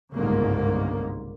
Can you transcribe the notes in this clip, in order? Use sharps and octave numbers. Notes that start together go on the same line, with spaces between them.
G1 C2 G#2 C#3 A#3